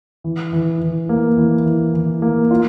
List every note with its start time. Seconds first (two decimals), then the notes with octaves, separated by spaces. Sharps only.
0.24 E3
0.53 E3
0.81 E3
1.09 A#3
1.38 E3
1.66 E3
1.94 E3
2.22 A#3
2.51 F4